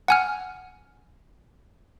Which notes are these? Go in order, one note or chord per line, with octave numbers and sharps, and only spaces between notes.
F#5 G#5 F6